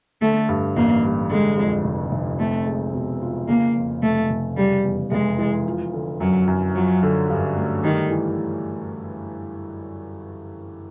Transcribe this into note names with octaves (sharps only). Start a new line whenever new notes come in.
D3 A3
G2
A1 A#3
G3
D3 G#3
F2
F1
F1
A3 C4
G#3
B2
F4
C#3 A#3
F2
F1 A3
F1
C#3 G3
E2
F1 G#3
E3
F3
D3
F#2 F#3
F#2
F3 F#3
D3
G2
A3
D#3 G3
E3